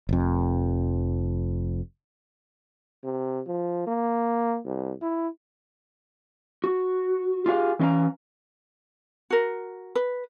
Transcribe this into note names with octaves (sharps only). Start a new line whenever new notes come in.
F1 F2
C3
F3
A#3
C2
E4
F#4
F4 G4 G#4 E5 F5
E3 C#4 D#5 F5 A#5
F#4 A#4
B4